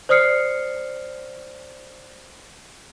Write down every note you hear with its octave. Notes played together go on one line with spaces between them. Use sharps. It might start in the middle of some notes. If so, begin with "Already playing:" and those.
C5 D5 D#6 F6 C7 C#7